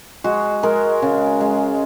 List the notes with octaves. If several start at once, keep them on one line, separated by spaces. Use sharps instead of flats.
G#3 F#4
G#3 A#4
C#3
G#3